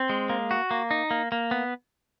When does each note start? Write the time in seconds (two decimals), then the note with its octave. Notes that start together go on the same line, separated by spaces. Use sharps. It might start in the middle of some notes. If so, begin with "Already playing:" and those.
Already playing: C4
0.10 G#3
0.30 A#3
0.51 F#4
0.71 A#3
0.91 D#4
1.11 A#3
1.32 A#3
1.51 B3